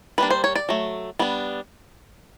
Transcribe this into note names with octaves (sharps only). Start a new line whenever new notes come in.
G3 A#3 D4 B4
C5
C#5
D5
F#3 A3
G3 B3 D4